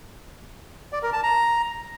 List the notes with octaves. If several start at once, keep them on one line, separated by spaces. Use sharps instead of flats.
D5
A#4
A5
A#5